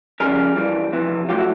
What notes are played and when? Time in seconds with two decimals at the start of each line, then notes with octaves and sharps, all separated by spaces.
0.20 F2 C#3 E3 G3 G#4 A#4
0.56 G2 E3 G3
0.93 F2 C3 E3
1.29 A2 F#3 F4 G4
1.38 E4 F#4